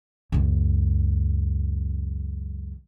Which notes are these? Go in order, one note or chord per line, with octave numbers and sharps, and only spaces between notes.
C#2 F#2